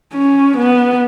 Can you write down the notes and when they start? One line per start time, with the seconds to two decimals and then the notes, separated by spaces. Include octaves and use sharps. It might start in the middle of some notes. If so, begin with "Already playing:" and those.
0.14 C#4
0.57 B3